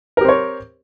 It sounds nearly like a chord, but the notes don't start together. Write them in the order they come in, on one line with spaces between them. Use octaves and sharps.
A#4 G4 C4 C#5